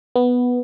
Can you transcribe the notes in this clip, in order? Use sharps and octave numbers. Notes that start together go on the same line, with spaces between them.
B3